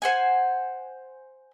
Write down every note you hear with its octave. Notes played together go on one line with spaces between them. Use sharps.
C5 F#5 G#5